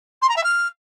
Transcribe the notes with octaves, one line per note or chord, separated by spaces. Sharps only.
C6
A#5
E5
F6